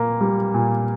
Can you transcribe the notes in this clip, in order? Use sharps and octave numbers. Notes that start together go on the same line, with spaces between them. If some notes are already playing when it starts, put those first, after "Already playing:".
Already playing: A#2 A#3
G3
A#2